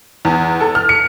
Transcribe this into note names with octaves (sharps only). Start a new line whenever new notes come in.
E2
A4
F6
C#7